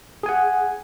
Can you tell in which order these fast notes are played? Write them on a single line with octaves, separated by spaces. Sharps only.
G#4 G#5 F#5